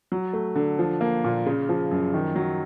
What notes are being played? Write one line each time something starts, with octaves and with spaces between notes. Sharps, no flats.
F#3
A3
D3
F3
A#3
A#2
C#3
F3
F#2
D#3
F#3